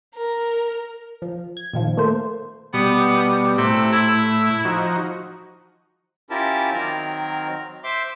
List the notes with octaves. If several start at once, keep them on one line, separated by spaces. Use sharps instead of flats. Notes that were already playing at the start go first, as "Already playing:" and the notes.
A#4
F3
G#6
A#2 D#3 F3
A3 A#3 C5
B2 G3 B3
A2 C3 E6
E4
F3 D#4 F#4
C#4 E4 F4 G4 A#4 A5
D#3 F#3 C4 A#4 F6
C5 E5 C6 D6